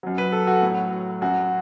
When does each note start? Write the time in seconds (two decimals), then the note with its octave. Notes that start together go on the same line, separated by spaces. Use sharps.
0.03 F#2 F#3
0.18 B4
0.32 A4
0.47 F#4
0.62 A2 F#3
1.21 F#2 F#3 F#4